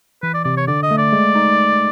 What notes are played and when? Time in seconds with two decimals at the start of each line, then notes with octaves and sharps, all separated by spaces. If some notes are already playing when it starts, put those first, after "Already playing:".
0.22 E3 B4
0.34 D5
0.45 C3 D5
0.57 C#5
0.67 D3 D5
0.83 D#5
0.91 A3
0.98 D5
1.13 G#3
1.35 D#4